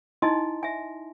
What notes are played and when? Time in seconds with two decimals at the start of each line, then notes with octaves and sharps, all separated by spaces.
0.22 D#4 E4 D#5 G#5 A5 C6
0.63 E5 G#5